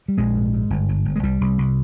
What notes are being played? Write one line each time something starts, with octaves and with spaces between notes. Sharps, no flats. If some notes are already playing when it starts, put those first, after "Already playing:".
G3
A#1 G#3
G#2
G#2
G1
G1
G1
G#3
C2 G3
C2
C2